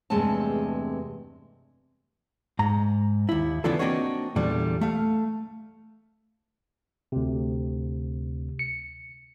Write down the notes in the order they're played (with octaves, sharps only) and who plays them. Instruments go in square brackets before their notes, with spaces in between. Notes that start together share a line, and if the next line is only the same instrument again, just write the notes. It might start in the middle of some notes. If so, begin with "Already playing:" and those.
[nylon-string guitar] E2 G2 C3 G#3 A3 A5
[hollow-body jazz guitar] G#2 A#5
D#2 E4
C#3 E3 B3 D4 F4 A4
A#3 C4 D4 D#4 F#4 C#5
E2 A#2 D3 G3
A3 F5
[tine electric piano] D2 C3
C#7